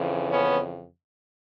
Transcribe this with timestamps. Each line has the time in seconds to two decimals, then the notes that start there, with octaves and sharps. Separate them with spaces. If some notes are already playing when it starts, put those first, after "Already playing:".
Already playing: F2 C#3 E3
0.29 B3 C#4